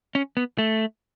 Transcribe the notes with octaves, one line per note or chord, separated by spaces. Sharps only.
C#4
B3
A3